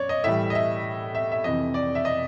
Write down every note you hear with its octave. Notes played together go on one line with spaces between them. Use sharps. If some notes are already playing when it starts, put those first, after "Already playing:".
Already playing: F#2 C#5 D5
D#5
A2 E3 G3 E5
D#5
E5
E5
E5
F2 C3 E3 D#5
D5
E5
D#5